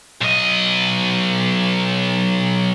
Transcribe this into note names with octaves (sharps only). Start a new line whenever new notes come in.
B1 D#5